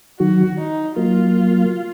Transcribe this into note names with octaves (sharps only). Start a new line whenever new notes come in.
D#3 F#3 F#4
D#4
F#3 A#3 F4